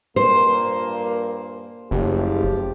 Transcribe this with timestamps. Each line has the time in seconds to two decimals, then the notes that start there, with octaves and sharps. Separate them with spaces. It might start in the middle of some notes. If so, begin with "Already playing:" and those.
0.16 G2 A#2 A#3 C5
1.91 F#1 F3 A3 G4